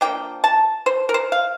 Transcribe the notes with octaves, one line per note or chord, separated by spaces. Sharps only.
F3 A#3 D4 G5
A5
C5
A#4
C5
F5